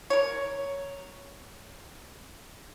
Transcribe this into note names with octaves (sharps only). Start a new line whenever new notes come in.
A#4 C#5